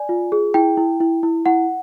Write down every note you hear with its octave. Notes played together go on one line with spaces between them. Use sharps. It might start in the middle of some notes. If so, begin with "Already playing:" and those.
Already playing: D5 G#5
F4
G#4
E4 G5
E4
E4
E4
E4 F#5